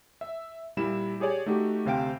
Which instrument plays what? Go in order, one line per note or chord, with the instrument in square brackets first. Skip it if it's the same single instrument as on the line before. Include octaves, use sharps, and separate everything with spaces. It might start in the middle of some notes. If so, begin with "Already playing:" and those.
[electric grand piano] E5
A#2 G3 E4 E7
G4 G#4 C#5 D5 G#5
A3 D#4 F#4 G4
D2 C3 C5 F5 G5 D7